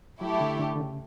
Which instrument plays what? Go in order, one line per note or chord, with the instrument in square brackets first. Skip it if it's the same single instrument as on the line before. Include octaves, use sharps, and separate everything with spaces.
[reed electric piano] F#3 [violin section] A3 E4 G4
[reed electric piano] D3
D3
D3
C#3